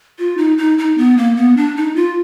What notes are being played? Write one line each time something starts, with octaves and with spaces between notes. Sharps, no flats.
F4
D#4
D#4
D#4
B3
A#3
B3
D4
D#4
F4